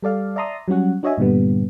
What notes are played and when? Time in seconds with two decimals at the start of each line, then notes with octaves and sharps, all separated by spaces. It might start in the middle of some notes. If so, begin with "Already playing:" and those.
0.03 G3 A4 D5 F5
0.36 D5 E5 A5 A#5 C6 D#6
0.68 F#3 G3 C#4 F#4 F#5
1.03 D4 F#4 C#5 D#5 E5 G#5
1.18 G2 A#2 D3 G3 B3